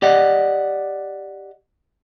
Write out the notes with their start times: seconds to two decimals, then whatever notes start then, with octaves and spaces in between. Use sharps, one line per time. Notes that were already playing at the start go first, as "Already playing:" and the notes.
0.02 G4 D5 D#5 F#5